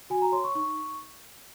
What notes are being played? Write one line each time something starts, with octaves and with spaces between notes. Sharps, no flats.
F#4 G#5
A#5
C#5 C6
C#6
D#4 C#6